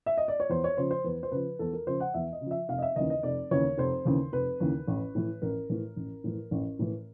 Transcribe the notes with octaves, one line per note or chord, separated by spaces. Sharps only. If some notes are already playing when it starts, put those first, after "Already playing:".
E5
D#5
D5
C#5
E2 C5
C#5
C#3 F3 C5
C5
E2 B4
C5
C#3 F3 B4
E2 A4
A#4
C#3 F3 C5
F#5
E2 E5
D#5
C#3 F3
E5
F1 F5
D#5
E5
D#2 C#3 E3 D#5
D#5
F1 D5
D#2 C#3 E3 C#5
F1 C5
D#2 C#3 E3
F1 B4
D#2 C#3 E3
A1
A2 E3
A1 A#4
A2 E3
A1
A2 E3
A1
A2 E3